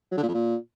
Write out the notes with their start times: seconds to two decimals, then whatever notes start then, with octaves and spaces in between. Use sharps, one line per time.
0.12 F#3
0.17 D3
0.23 A#2
0.28 F2
0.34 A#2